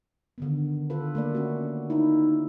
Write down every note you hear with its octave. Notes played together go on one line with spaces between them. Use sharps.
D3 D#3 B3
F4 A4 B4
A3 A#3 D5
C#4 F#4
D#4 E4